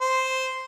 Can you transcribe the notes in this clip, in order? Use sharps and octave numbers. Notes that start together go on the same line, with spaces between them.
C5